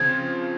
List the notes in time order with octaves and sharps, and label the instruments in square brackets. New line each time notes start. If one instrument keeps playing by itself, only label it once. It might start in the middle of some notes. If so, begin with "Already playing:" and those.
Already playing: [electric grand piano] C#3 F3 C4 F4 [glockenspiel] G#6